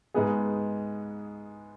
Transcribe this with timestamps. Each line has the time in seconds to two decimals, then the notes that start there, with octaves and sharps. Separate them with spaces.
0.14 G#2 G#3 B3 G#4